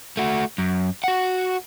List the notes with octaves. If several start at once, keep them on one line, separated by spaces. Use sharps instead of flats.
A3 F#4
F#2
F#4 F#5